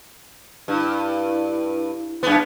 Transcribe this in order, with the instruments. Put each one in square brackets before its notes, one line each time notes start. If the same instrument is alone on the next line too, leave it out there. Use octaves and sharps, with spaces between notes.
[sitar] G2 [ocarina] E4
[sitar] F#2 B3